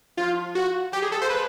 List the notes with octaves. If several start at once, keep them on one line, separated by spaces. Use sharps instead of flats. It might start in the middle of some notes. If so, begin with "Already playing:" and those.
F3 F4
F#4
F#3 G4
G3 G#4
G#3 A4
A#3 C5
G#3 B4